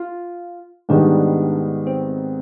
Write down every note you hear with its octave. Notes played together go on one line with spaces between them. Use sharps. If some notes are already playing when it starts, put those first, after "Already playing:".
Already playing: F4
G#2 D#3 G3 B3 D4
C4